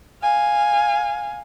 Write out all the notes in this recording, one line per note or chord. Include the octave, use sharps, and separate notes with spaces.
F5 G#5